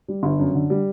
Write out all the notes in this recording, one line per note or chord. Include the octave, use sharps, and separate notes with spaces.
G3
G1
F#2
D3
G3